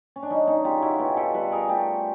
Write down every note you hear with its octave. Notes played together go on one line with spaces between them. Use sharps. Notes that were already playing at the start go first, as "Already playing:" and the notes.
C#4
D4
F#3 C#4 D#4
C#4 D#4
C#3 F4 G4
E4 F#4
B2 F4 G4
G4 A4
G3 A4 B4
G#4 A#4
A3 G4 A4